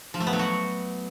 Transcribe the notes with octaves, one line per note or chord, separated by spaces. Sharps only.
F3
A3
B3
F#3
F#4